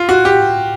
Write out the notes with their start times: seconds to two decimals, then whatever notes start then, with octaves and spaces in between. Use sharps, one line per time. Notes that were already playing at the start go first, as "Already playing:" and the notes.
Already playing: F4
0.09 F#4
0.25 G4